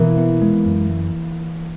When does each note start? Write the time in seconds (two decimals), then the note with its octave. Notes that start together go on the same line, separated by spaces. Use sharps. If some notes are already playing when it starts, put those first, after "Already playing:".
Already playing: B2 E3 A#3
0.17 B3
0.42 G#3
0.66 F#2